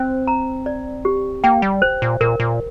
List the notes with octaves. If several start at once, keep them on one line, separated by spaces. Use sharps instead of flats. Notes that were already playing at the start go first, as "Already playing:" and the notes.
Already playing: C4 C5
A#5
D5
G4
A#3 G5
G3
C5
A#2
A#2 A#4
A#2